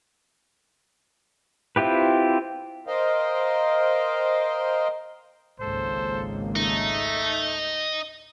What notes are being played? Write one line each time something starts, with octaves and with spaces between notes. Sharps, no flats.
C4 E4 F4 G4 B4
A#4 C5 D#5 F5 G5
G#1 C#2 A#3 A4 C5
A3 D#4